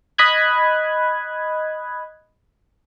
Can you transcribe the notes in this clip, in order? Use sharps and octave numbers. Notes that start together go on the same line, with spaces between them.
D#5 B5 D#6 F#6 G#6